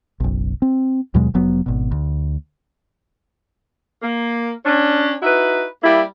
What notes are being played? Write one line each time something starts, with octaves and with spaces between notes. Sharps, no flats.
F#1 B1
C4
D#2 B2 F#3 G#3
F1 F#3 B3
G#1 B2
D2
A#3
C#4 D4
D#4 E4 F#4 B4
G3 A#3 E4